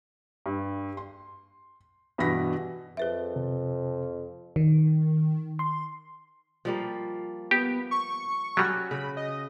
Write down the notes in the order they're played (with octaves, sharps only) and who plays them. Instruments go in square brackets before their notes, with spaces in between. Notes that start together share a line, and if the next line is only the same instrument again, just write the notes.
[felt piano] G2
C6
G2 B2 E3 F#4 A#6 B6
[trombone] F2 [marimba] G#4 B4 E5
[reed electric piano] C3
[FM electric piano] D#3
C6
[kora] F3 G3 A#3
[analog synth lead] B3 [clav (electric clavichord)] G4
[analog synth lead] C#6
[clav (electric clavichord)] F#3 G3 [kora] C#4 F#4
[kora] C#3 [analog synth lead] B5
[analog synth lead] D#5